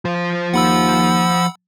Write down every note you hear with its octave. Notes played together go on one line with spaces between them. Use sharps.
F3 C5
D#2 F#5 B5 E6